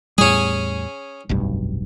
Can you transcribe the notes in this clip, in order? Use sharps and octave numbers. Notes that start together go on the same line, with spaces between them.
E2 A2 G3 C#4 G#4
F1 B1 G2